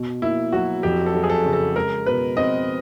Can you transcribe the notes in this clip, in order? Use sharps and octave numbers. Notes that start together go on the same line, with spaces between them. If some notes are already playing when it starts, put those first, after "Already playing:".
Already playing: B2
A#3 E4
F#3 F#4
F2 G4
A4
F#3
G#4
A4
C#3
A4
G#3 A#4
B2 B4
C4 D#5